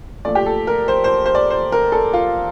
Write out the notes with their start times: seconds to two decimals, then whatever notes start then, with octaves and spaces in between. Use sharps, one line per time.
0.25 A#2 F3 A3 D5
0.35 G4
0.46 A4
0.67 A#4
0.88 C5
1.04 C5
1.26 C5
1.35 D5
1.50 C5
1.72 A#4
1.92 A4
2.14 F4